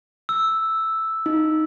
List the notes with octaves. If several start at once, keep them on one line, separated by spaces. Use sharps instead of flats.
E6
D#4